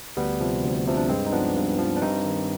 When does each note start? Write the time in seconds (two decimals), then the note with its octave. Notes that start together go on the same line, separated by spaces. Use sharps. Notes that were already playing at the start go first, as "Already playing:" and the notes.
0.17 D2 G3 B3
0.40 C3 F3
0.64 D2
0.87 C3 F3
0.97 D4
1.09 G2 G#3 C4
1.26 D#4
1.32 F3 B3 D4
1.56 G2
1.79 F3
1.97 D4
2.02 G2 C4 D#4
2.25 D#3